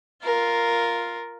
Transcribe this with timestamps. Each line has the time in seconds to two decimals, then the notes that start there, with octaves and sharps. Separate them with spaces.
0.23 F4 A#4